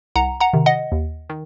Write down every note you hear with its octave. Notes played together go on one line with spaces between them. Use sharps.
C2 F#5 A#5
F#5 A#5
C3 D#3
D#5 F#5
D#2
D#3